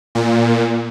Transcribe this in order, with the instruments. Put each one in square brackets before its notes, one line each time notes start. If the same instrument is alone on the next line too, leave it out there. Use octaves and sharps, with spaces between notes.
[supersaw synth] A#2